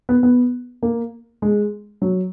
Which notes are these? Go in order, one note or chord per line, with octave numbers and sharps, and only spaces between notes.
B3
B3
A#3
G#3
F#3